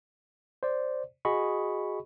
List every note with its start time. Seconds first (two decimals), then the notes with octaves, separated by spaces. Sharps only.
0.63 C5 D5
1.25 F#4 G#4 D#5 B5 C#6